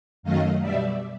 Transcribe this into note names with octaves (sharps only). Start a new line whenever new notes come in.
F#2 D#3 F#3 A3 D#5 F5
B2 G3 D5 E5